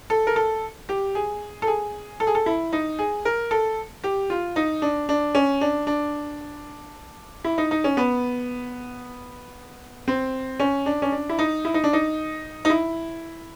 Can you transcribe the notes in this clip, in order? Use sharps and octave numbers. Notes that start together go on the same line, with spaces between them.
A4
A#4
A4
G4
G#4
A4
G#4
A4
G#4
A4
E4
D#4
G#4
A#4
A4
G4
F4
D#4
D4
D4
C#4
D4
D4
E4
D#4
D#4
C#4
B3
C4
C#4
D4
C#4
D4
E4
D#4
E4
D#4
D4
D#4
D#4
E4